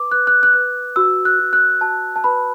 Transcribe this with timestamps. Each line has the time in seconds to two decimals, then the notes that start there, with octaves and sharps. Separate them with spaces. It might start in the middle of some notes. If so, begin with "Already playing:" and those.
Already playing: B4 D6
0.12 B4 F#6
0.27 F#6
0.43 F#6
0.53 B4 F#6
0.96 F#4 E6
1.25 F#6
1.39 F#4
1.53 F#6
1.81 F#4 A5
2.16 A5
2.24 B4 B5